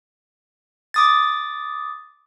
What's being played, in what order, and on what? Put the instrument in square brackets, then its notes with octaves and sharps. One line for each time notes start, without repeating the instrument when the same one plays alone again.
[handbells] D6 D#6 A6